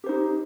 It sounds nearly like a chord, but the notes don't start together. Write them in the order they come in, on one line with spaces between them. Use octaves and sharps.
G4 C5 D#4